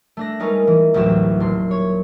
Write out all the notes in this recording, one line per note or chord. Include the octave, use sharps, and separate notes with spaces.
A3 D4 A#6
G3 G#3 C#4 D#4 A#4 B4
E3
A1 D2 F#3 G4 E7
D#1 C6
C#5